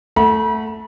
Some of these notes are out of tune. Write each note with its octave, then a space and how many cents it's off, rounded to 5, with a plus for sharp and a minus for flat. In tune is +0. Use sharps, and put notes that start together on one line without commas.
A3 +0 F#5 +0 B5 -40